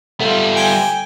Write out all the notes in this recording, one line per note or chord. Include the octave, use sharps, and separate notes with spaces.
G3 A3 B3 F4
G5 G#5